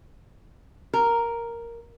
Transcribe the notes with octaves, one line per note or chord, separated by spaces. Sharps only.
A#4